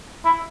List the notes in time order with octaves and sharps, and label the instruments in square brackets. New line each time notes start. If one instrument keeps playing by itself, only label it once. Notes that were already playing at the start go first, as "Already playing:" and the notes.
[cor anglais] E4